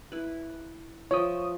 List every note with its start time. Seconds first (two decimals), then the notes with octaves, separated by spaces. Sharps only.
0.12 E4 B4
1.11 F3 C#5 E5 G5 D#6